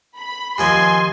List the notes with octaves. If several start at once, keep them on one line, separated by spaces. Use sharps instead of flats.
B5
D#2 F3 C4 G#5 C6